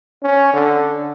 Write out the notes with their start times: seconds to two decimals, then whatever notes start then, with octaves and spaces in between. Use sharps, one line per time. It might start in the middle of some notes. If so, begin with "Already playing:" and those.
0.23 C#4
0.53 D3